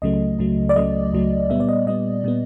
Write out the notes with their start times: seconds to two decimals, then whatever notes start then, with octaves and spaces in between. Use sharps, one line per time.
0.02 C#2 C#3 F#3 A3 D#5
0.39 C#2 C#3 F#3 A3
0.69 D5
0.76 C#2 C#3 F#3 A3 D#5
1.13 C#2 C#3 F#3 A3
1.50 A#2 G3 B3 E5
1.60 D5
1.69 D#5
1.87 A#2 G3 B3 D#5
2.24 A#2 G3 B3